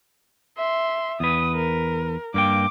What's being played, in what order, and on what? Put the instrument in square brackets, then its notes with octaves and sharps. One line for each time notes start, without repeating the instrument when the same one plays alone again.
[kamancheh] E5 C6
[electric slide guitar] E2 B4 [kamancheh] D#6
[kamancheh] A#4
[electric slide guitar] G2 A#3 G5 [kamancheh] D6